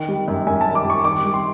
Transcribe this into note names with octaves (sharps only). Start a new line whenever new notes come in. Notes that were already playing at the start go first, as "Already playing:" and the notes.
Already playing: D#3
G3
F#2
F#2 G#5
A5
D#3
D6
G3
C#6
D#3 D6
G3
C6